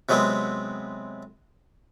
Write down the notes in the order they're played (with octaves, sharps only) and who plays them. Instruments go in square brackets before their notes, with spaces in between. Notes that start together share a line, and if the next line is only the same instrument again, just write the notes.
[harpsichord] C3 F#3 G#3 B3 C4